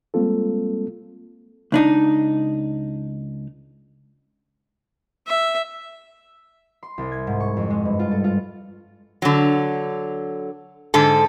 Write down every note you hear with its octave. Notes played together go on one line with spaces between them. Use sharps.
G3 G#3 A#3 C4 F4 A4
C#2 D4 D#4
E5
C6
C2
G#6
G#2
C#6
F2
G#3
G2
F4
A4
F4
D3 F#3
G#2 D3 A4